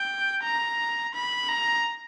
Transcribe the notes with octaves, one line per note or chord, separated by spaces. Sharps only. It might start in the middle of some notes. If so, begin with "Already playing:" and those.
Already playing: G5
A#5
B5
A#5